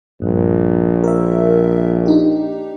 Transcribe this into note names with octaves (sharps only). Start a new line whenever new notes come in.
A#1 G2
A#4 E5
D4 D#4 G4